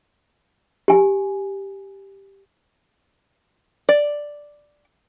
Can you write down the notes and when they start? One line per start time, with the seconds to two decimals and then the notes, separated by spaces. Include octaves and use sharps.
0.88 G4 G#5
3.89 D5